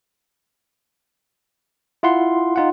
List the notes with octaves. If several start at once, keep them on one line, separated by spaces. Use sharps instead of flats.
E4 F4 F#5 C6
D#4 F4 F#5